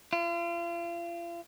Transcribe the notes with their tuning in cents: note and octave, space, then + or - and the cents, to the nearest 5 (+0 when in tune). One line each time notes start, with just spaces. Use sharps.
F4 -40